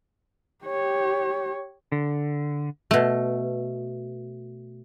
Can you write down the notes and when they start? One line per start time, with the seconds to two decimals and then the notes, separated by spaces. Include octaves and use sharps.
0.65 G4 C#5
1.92 D3
2.91 B2 A3